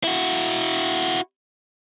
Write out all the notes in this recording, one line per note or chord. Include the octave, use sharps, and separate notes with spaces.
E4 F#4